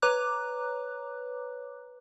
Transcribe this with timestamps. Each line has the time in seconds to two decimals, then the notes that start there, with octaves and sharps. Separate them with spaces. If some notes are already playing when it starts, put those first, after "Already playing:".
0.02 B4 C#5 A#5 D6 F#6